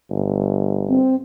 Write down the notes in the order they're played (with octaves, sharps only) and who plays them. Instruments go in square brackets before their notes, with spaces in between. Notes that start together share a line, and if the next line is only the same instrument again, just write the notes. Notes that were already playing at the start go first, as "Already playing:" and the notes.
[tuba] G1
[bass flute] C4